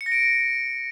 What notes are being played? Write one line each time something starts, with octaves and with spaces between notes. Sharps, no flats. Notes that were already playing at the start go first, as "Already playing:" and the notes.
C#7
A#6
D7